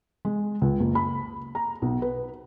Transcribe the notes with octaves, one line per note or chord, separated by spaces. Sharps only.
G#3
C#2
F#1
B5
A#5
B1
B4